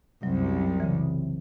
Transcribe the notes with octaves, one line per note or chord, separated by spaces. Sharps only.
C2 F#2 F#3
C#3 E3